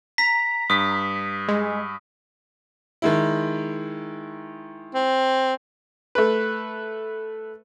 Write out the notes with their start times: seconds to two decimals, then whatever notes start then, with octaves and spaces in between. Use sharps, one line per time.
0.18 A#5 B6
0.70 G2 D#6 B6
1.48 G#3
3.02 D#3 G#3 E4
4.94 C4
6.15 A3 B4